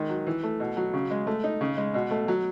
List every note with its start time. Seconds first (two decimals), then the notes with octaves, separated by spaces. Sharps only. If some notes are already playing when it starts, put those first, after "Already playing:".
Already playing: D#3 G#3
0.09 F#3
0.27 E3
0.43 A3
0.60 B2
0.77 F#3
0.94 C#3
1.11 G#3
1.27 A3
1.44 D#4
1.61 C#3
1.77 G#3
1.94 B2
2.11 A3
2.28 F#3